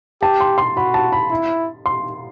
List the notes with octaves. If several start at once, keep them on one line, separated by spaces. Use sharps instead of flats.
G4 A5
C6
C6
F#4 B5
A5
B5
E4
C6